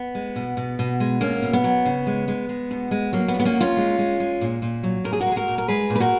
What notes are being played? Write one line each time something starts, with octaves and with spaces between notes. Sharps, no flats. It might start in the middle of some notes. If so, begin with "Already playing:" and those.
Already playing: B3
G#3
B2
B2
B2
G#3
B2 A#3 C#4
B2
B3
F#3
C#3
G#3
G#3
G#3
B2
G#3
F#3 A#3
B3
A#2
B3
A#3 C#4
A#2
C#4 F4
G#3
G#3
G#3
A#2
A#2
F#3
A#2 A#4
G#4
F#4 A#4
G#3
G#4
F#4 A#4
A#2
A#4
G#3 G#4 B4
A#2
B4
F#4 A#4